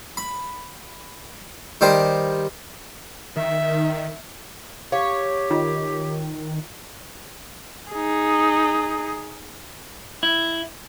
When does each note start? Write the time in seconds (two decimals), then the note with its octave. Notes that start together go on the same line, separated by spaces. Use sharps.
0.17 B5
1.81 D#3 G3 G4 C5
3.36 D#3 E5
4.92 G4 C#5 F5
5.51 D#3 F4
7.92 D#4 G#4
10.23 E4